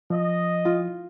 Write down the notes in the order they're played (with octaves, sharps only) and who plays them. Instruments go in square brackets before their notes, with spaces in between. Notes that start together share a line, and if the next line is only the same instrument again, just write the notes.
[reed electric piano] F3 [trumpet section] D#5
[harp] F4